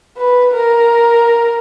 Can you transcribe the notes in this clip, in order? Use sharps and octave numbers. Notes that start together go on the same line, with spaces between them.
B4
A#4